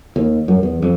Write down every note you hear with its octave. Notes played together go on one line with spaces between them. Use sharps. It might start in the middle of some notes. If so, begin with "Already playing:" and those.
D#2
F#2
E2
F2